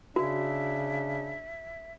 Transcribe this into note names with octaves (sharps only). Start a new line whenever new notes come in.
C#3 D4 F#4 E5